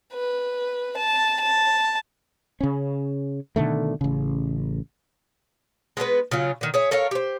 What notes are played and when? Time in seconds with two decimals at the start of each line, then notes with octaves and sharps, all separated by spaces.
0.13 B4
0.97 A5
1.40 A5
2.61 C#3 C#4
3.56 B2 D3 D#3 A3
4.01 A1 C#3
5.97 G#3 B3 D4 B4
6.31 C#3 F#3 F4
6.61 D3 D#3
6.74 G#4 C#5 E5
6.91 A4 A#4 C#5 F5
7.11 G4 C5